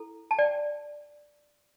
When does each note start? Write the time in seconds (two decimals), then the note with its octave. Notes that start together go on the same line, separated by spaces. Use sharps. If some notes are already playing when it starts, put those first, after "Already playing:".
Already playing: E4 A4
0.31 A5
0.38 D5 G5